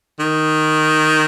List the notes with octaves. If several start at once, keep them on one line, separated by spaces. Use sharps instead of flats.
D#3